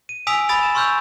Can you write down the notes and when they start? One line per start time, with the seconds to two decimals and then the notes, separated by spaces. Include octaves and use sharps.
0.09 D#7
0.27 G#5 D#6 E6 B6 D7 F7
0.49 B5 D#6 A6 D7 F7
0.63 E7
0.75 C6 C#6 E6 F6 G6 F7